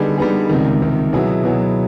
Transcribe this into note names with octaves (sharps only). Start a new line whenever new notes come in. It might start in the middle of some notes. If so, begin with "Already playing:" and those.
Already playing: D3 G3 B3 D#4 G#4
D3 G3 B3 D#4 G#4
C#2 C3 D#3
C#2 C3 D#3
B2 F#3 B3 E4 G#4
B2 F#3 B3 E4 G#4